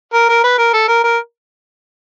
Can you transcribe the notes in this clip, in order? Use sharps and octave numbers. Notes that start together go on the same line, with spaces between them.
A#4
A#4
B4
A#4
A4
A#4
A#4